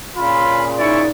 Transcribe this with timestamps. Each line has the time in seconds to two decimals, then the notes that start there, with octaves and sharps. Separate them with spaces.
0.17 A#2 C#3 F4 B5
0.79 D#4 E4 D5 B5 C#6